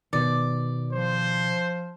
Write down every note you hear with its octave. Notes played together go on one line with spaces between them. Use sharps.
B2 D#3 D5
F3 C5